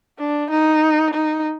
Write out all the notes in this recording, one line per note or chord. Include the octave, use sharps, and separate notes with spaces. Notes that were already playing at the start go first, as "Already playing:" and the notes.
D4
D#4
D#4